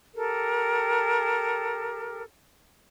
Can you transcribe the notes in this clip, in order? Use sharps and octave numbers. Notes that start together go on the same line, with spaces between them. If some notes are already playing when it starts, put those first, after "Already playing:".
G4 A4 A#4